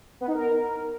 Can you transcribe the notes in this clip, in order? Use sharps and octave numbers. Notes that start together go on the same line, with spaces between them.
B3
D#4
A#4